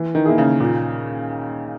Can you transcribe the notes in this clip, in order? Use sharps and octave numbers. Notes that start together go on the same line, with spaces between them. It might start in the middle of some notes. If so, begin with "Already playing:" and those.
Already playing: E3
D#3
A#3 E4 G#4
C#3
A#2